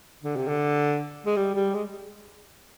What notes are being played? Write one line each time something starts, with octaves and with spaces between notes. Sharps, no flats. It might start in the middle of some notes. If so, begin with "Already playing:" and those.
D3
C3
D3
G#3
G3
G3
G#3